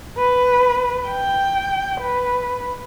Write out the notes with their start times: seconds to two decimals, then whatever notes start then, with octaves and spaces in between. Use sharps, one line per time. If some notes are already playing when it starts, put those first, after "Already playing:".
0.18 B4
1.08 G5
2.01 B4